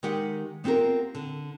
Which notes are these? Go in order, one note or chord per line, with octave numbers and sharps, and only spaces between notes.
D#3 G#3 G4 F#5
B3 C4 F4 G4 A#4
D3